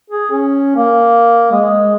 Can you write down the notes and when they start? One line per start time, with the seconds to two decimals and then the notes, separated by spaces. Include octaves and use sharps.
0.10 G#4
0.31 C#4
0.76 A#3
1.51 G#3